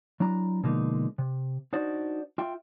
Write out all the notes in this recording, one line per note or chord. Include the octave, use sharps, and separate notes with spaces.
F#3 D4 E4 A#5
B2 D3 F3 G#3 A#3 D#4
C3
D4 D#4 F#4 C5 D5
F4 E5 G5